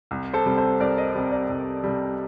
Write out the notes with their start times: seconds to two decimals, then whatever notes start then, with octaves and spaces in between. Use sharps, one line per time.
0.11 C2
0.33 A4 C5
0.46 C3 G3
0.57 A4 C5
0.80 C2 A#4 D5
0.97 C5 D#5
1.15 C3 G3
1.32 A#4 D5
1.50 C2
1.84 C3 G3